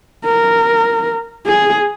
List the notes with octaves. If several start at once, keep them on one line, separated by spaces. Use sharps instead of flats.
A#4
G#4